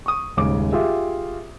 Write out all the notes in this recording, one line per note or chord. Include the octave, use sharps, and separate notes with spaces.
C#6 D#6
D#1 G#2 C#3 D6
F4 G4 G#4 E5